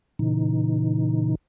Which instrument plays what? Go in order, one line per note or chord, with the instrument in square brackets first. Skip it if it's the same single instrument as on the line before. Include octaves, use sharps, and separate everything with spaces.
[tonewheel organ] A#2 C#3 E3 D#4